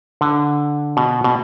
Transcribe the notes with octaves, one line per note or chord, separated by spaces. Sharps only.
D3
B2
B2